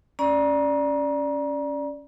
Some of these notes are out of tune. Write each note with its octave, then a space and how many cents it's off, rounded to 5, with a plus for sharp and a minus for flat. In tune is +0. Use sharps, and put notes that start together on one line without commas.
C#4 +5 D5 +0 A#5 +35